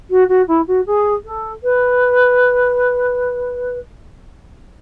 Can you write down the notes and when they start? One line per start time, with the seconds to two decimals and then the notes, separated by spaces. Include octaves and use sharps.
0.10 F#4
0.28 F#4
0.47 E4
0.67 F#4
0.86 G#4
1.25 A4
1.63 B4